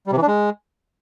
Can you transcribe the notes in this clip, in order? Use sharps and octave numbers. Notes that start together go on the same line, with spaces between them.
G3
C3
E3
D4
G#3